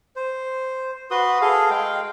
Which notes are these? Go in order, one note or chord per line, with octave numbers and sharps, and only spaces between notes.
C5
F#4 B4 C6 D#6
G#4 A4 F5
G#3 F5 G5